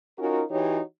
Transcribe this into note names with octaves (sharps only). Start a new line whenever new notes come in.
C#4 D#4 F4 F#4 A#4
E3 D#4 F#4 G4 C#5